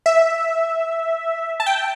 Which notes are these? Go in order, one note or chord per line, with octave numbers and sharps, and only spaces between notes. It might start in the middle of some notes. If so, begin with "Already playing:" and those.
E5
A5
G5